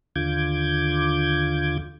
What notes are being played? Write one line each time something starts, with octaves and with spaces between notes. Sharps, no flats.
D#2 D3 F4 D6 G6 G#6